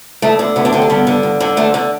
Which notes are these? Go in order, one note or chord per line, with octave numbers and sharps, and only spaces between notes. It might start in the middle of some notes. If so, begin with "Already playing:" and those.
D2 A3
D3
D2 B3
D4
D3 G4
D4
G2 B3
D3
G2
D3
D2 A3
D3